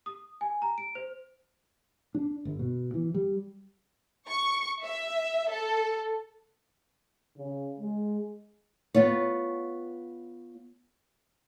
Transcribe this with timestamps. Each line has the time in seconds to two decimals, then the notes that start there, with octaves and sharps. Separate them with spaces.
0.06 D#6
0.41 G#5
0.62 A#5
0.78 D7
0.95 C5
2.15 D4
2.45 G1
2.59 B2
2.94 E3
3.14 G3
4.28 C#6
4.83 E5
5.49 A4
7.37 C#3
7.80 G#3
8.94 B3 F4 C#5